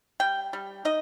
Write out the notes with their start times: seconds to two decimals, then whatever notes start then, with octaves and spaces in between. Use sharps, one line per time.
0.20 G3 G5
0.53 G3
0.85 D#4 D#5